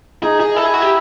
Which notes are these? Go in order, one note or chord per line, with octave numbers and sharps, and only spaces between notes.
D#4 G#4
G#4
E4 A4
G#4
F#4
G4